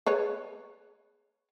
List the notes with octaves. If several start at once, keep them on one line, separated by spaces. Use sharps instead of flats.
G#4 B4 C#5